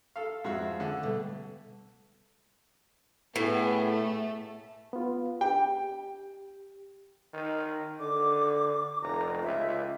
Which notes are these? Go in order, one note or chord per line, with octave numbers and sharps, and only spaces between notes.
A4 F5
F2 G#3 F#4 G#4 E5 F5
D3
B2 G3 A3
A2 B3 G4 G#4
A3
B3 F4
G4 G5
D#3
D3 D6
F1 A#5
C#2 E5